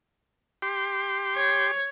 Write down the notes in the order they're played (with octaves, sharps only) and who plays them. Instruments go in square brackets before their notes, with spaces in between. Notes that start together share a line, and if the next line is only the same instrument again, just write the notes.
[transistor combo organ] G4 C6
[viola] C#5